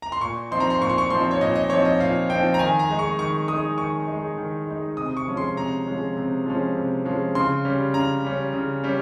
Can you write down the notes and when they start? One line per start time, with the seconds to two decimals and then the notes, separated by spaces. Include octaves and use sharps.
0.02 A#5
0.12 C6
0.21 A#2 C#6
0.51 F3 C4 D#4 C6
0.60 A#5
0.70 C6
0.81 A#2 C#6
0.90 C6
0.98 C#6
1.10 F3 C4 D#4 C6
1.31 C#5
1.40 A#2 D#5
1.55 D#5
1.70 F3 C4 D#4 C#5
1.85 D#5
2.00 A#2 F5
2.29 F3 C4 D#4 G5
2.54 A#5
2.59 D#3 G#5
2.79 A#5
2.89 G#3 D#4
2.99 C#6
3.19 D#3 C#6
3.48 G#3 D#4 D#6
3.78 D#3 C#6
4.08 G#3 D#4
4.38 D#3
4.67 G#3 D#4
4.97 C3 D#6
5.17 C#6
5.27 F3 G#3 C#4
5.37 C6
5.56 C3 A#5
5.86 F3 G#3 C#4
6.17 C3
6.46 F3 G#3 C#4
6.75 C3
7.05 F3 G#3 C#4
7.35 C#3 C6
7.65 G3 C#4
7.94 C#3 A#5
8.24 G3 C#4
8.53 C#3
8.84 G3 C#4